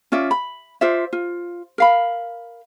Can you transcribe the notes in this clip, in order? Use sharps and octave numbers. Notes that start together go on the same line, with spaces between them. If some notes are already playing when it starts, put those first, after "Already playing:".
C#4 F4 D5 E5
B5
F4 C5 D5 E5
F4
A#4 F5 B5